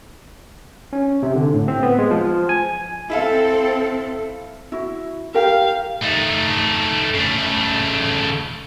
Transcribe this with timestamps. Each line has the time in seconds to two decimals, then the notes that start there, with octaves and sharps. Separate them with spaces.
0.93 C#4
1.23 C3
1.35 D3
1.54 A2
1.68 C4
1.83 B3
1.99 G#3
2.11 F3
2.49 G#5
3.10 C4 E4 A4 E5 F5
4.72 E4 F#4
5.34 G4 A#4 F5
6.03 A3 D#4
7.14 C#3 A3